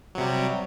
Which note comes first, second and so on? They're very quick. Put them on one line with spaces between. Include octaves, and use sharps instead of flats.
F#3 C3 G3